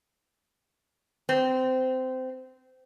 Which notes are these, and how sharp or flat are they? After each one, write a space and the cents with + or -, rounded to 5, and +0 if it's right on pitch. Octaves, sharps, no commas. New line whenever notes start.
C4 -20